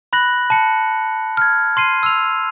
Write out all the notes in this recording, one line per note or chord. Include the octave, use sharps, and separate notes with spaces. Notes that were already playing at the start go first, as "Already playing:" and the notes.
B5 F#6 A#6 F#7
A5 C#7
F6 G#6
C6 C7 D#7
E6 F7